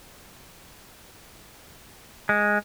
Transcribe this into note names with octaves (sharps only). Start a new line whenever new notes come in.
G#3